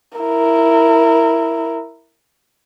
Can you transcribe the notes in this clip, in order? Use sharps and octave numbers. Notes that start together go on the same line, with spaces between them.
E4 A#4